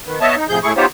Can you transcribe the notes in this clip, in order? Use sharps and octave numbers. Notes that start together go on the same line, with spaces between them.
D#3 B3
B3 C#5 D#5 E5 A5
D#4
A2 C3 F3 G#4 G6
A2 A3 E4 G#4 C#6
B3 D#4 F4 G4 C5 C#5